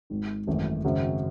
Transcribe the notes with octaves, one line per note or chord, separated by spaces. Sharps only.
G#1 G#2 D#3
G#1 F#2 E3 A3 C#4
G#1 F#2 C#3 F#3 C4